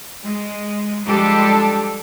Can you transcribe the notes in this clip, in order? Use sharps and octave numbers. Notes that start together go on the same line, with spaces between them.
G#3
F3 G3 G#3 D4 G4 A4